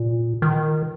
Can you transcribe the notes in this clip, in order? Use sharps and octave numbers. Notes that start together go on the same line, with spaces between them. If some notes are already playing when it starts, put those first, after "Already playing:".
Already playing: A#2
D#3